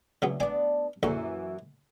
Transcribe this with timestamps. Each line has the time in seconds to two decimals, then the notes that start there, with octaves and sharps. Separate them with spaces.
0.22 D2 C#3 F#3 B3
0.40 B3 D4 D5 G#5
1.03 A#1 F#2 D3 E3 F#4